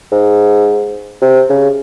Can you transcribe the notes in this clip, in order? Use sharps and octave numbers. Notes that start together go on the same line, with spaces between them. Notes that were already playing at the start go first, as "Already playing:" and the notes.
G#2
C3
C#3